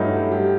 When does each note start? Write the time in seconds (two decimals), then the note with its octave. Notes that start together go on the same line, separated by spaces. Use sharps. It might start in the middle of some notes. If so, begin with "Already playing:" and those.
Already playing: G2 F#3 A3 D#4 E4
0.32 G4